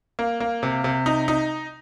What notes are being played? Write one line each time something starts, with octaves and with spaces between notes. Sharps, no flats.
A#3
A#3
C3
C3
D#4
D#4